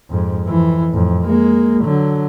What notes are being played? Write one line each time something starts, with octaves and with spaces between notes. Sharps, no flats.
F2 G#2
F2 E3
F2 A2
G#3 A#3
D3 F#3